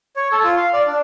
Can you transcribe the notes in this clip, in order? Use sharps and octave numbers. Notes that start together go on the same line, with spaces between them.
C#5
A4
F4
F5
D5
D4